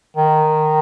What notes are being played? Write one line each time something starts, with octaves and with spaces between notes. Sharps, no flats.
D#3